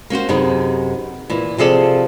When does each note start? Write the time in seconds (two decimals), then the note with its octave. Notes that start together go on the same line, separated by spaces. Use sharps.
0.10 A#3 C#4 F#4 C5
0.29 F#2 C3 B3 D#4 G#4
1.30 A#2 E3
1.58 C3 F3 G#4 A4 D5